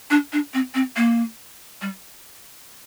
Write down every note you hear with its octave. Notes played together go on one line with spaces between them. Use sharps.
D4
D4
C4
C4
A#3
G3